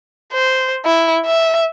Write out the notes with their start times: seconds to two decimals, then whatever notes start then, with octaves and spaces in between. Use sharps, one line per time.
0.33 C5
0.86 E4
1.26 E5